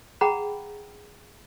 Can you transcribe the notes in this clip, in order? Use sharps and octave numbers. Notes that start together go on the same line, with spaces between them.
G#4 F#5 G5 A#5 B5